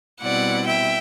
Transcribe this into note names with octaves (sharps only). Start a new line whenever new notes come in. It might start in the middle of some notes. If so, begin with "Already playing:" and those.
B2 G3 C4 E4 D5 F#5
E5 G5